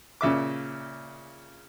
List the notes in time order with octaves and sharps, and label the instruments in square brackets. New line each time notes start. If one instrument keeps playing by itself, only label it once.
[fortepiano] A#2 C#3 E5 D6